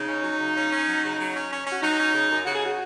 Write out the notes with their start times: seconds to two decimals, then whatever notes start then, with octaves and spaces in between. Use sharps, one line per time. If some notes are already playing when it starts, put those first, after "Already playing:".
Already playing: C#3 D#4
0.08 C#4
0.23 F#3
0.39 C#3
0.56 C#4
0.71 C#4
0.87 F#3
1.03 C#3
1.19 F#3
1.35 C#4
1.50 C#4
1.66 C#4
1.73 F#4
1.83 F#3 D#4
1.99 C#4
2.14 C#3
2.30 F#2
2.45 C#3 F#4
2.55 G#4
2.66 F#4